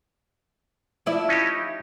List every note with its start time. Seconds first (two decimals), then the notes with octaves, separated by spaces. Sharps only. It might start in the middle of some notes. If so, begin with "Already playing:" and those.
1.06 F3 E4 D5
1.28 C#4 D#4 G4